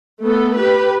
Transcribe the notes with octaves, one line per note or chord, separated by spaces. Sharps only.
A3 B3 A4
G4 B4